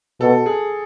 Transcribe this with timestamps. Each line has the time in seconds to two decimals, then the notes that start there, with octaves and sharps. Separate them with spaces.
0.20 B2 A4
0.46 G#4